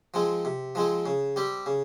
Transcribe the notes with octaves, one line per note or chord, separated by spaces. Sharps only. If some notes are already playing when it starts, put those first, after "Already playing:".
F3 G#3 C4
C3
F3 G#3 C4
C#3
G3 C4 G4
C#3